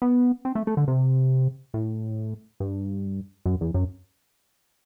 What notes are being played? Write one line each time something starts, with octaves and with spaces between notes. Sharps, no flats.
B3
C4
A3
A3
D3
C3
A2
G2
F#2
E2
F#2